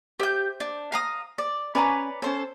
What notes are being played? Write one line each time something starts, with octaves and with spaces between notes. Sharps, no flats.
G4 C5 E5 G6
D4
F5 A#5 D#6
D5
C#4 B4 C#5 D5 G#5 A#5
C#4 A4 C5 C#5